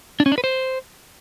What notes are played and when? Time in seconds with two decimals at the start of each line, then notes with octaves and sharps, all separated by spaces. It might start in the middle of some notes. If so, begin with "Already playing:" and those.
0.20 D4
0.26 C#4
0.32 D4
0.38 B4
0.44 C5